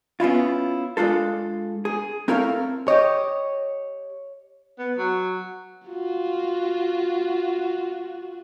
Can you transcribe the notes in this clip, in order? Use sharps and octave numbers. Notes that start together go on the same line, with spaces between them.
B3 C#4 E4 F4
G#3 D4 F4 A4
G#4
C4 E4 A4 A#4 C#5 F5
G4 C#5 D#5
B3
F#3
F4 F#4